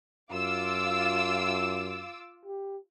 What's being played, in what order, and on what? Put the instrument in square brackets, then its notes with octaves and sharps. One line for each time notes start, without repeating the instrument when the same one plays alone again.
[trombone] F#2 [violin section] F4 D6 E6
[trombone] G4